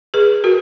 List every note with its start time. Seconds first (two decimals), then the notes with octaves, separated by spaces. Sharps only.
0.14 G#4 B4
0.44 F#4 A#4